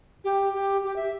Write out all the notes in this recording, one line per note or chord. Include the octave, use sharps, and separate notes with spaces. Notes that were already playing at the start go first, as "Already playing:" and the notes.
G4
G4
G4
E5